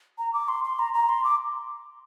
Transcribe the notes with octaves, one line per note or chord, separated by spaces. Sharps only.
A#5
D6
C6
C6
A#5
A#5
C6
D6